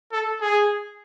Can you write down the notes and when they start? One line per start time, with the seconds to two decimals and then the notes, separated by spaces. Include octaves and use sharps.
0.13 A4
0.41 G#4